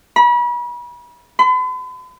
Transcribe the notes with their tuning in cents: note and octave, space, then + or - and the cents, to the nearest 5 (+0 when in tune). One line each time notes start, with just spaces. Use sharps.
B5 -35
B5 +45